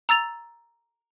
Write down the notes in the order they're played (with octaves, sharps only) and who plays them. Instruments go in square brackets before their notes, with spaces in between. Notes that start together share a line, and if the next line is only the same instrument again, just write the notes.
[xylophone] A#5 E6 A6 F7